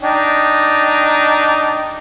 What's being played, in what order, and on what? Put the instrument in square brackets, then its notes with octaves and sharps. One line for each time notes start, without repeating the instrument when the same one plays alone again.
[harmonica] D4 D#4 G5